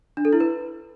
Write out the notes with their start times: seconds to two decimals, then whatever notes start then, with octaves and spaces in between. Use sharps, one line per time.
0.17 D4
0.25 A4
0.33 E4
0.40 B4